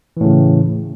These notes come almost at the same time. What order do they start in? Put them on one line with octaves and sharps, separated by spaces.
E3 A2 C#3